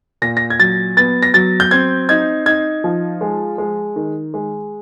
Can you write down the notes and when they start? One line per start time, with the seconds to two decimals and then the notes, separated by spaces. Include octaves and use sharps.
0.22 A#2 A#6
0.37 A#6
0.50 G#6
0.60 F#3 A6
0.97 B3 A6
1.23 A#6
1.34 F#3 A6
1.60 G6
1.71 C4 G#6
2.09 D#4 G#6
2.46 D#4 G#6
2.84 F3
3.21 G#3
3.58 G#3
3.96 D#3
4.34 G#3